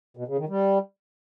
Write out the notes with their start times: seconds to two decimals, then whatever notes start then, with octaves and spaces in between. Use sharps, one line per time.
0.17 B2
0.27 C#3
0.38 D#3
0.49 G3